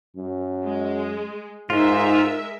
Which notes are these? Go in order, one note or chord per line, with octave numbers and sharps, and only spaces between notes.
F#2
G#3
G#2 G#3 D#4 F4 A#4 E5